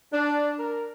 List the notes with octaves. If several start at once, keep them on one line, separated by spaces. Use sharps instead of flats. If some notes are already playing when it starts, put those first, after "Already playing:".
D4
A#4